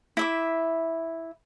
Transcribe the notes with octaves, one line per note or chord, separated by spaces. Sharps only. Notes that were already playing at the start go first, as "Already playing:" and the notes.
E4 E5 D6